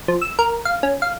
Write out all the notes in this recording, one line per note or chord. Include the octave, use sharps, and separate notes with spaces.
F3
E6
A#4
F5
C#4
F5